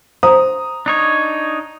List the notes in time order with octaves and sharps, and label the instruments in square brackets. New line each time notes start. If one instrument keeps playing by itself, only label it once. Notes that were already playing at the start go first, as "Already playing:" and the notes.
[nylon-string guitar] C5 [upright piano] A#5 D#6
[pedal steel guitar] D4 D#4 C#5